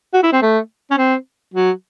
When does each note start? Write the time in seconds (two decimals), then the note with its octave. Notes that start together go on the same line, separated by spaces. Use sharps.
0.14 F#4
0.23 E4
0.32 C4
0.42 A3
0.91 C#4
0.98 C4
1.54 F#3